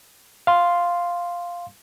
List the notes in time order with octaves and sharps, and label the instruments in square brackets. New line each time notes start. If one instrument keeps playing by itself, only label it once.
[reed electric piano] F5 C6